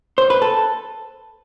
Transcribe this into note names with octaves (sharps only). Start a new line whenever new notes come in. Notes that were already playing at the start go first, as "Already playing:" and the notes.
C5
B4
A4